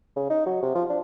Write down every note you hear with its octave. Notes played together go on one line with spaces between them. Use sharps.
C#3
D#4
F#3
C3
F3
D4